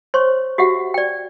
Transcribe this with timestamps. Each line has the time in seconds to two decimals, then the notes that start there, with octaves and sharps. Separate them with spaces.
0.14 C5 C#5 C6 C#6
0.58 F#4 G4 E5 F#5
0.94 D5 G5